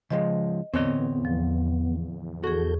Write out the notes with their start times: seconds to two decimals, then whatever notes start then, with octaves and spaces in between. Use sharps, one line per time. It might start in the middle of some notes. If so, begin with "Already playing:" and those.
0.10 C#3 F3 G#3 D#5
0.74 E2 A2 D3 B3 C4 C#5 D#5
1.25 F3
2.44 F#4 G#4 A4 C#6 G6